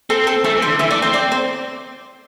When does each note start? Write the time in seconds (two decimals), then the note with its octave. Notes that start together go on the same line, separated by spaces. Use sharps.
0.10 C4 A4
0.27 A4
0.44 A3 A4
0.56 E3
0.62 C5
0.67 D3
0.79 E3 E5
0.90 A3 D5
1.02 C4 C5
1.14 D5
1.32 C5